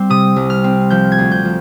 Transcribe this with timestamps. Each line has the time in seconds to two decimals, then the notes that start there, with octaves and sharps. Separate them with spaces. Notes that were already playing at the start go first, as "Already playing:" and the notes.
Already playing: G3 C4
0.10 C3 D#6
0.36 C2
0.50 F6
0.64 C4
0.90 F3 G6
1.12 G#6
1.18 D2
1.31 G6
1.45 F3